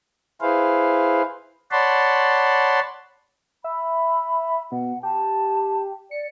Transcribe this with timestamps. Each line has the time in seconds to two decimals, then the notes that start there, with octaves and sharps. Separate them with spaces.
0.41 E4 G#4 B4 C5 F5
1.71 C#5 D5 F#5 A5 B5 C6
3.64 E5 B5
4.72 B2 F#5
5.03 G4 A5
6.11 D5 C#7